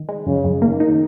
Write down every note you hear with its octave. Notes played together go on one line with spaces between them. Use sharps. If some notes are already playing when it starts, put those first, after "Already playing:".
Already playing: D#3
G#3
F#2 C#3
F#2
D#3 A#3
D#4